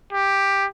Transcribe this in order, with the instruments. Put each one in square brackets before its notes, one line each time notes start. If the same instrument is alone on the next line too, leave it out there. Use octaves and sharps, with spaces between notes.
[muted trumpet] G4